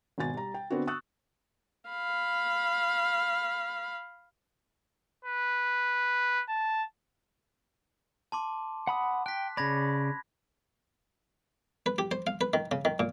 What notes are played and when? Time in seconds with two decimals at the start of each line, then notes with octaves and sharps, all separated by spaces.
0.18 G#1 B2 G#5 A6
0.34 G3 A#5
0.54 G5
0.70 D3 B3 C4 D4 F#4
0.87 C#6 D#6 E6 F#6 A6
1.89 F5 B5
5.25 B4
6.49 A5
8.32 A5 C6 D6
8.87 F#5 B5 D#6
9.26 G5 F#6 B6
9.57 C#3 D5 B5 G#6 A#6
11.86 B4
11.98 G4
12.11 C5
12.27 F5
12.41 B4
12.54 D#3
12.71 C#3
12.85 D#3
12.99 A#2